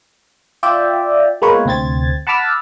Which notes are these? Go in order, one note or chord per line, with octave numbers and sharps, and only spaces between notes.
F4 D5 E5 G5
G#3 A#3 B3 F4 B4 C#5
D2 C3 C4 G#6 A6
F#5 A5 B5 D6 E6 F6